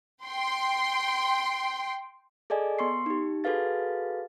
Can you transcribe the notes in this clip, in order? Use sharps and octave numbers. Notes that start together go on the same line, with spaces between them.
G5 C6
G#4 A4 D5 D#5 G#5
B3 C6 C#6 C7
D#4 G4
F#4 G#4 A4 B4 F5 A6